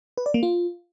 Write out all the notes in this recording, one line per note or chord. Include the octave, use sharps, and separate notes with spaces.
B4
D5
A#3
F4